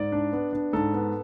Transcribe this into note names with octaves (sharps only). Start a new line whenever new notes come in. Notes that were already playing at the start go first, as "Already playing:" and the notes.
Already playing: G#2 D5
D4
B3
D4
G#2 A4
B3